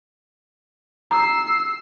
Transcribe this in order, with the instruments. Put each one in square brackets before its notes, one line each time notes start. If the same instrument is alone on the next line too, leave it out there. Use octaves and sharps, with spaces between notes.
[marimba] A#5 [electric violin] E6 C7